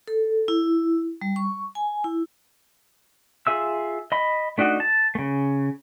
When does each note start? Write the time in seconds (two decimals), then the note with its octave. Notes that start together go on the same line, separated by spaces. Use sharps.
0.08 A4
0.48 E4
1.21 G3
1.36 C#6
1.75 G#5
2.04 E4
3.47 F4 G#4 E5 E6
4.12 D#5 B5
4.58 A3 D4 D#4 F#4 D#5
4.80 A5
5.15 C#3 A3